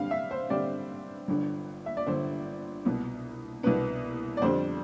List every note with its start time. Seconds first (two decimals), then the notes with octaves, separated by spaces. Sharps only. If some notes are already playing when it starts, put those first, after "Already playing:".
Already playing: G2 D3 G3 C4 F5
0.11 E5
0.31 C5
0.50 G2 D3 G3 C4 D5
1.28 G1 G2 D3
1.86 E5
1.97 D5
2.07 G1 G2 D3 C5
2.85 C2 B2 B3
3.63 C2 B2 B3 B4
4.37 D5
4.42 F2 D3 G3 D4 C5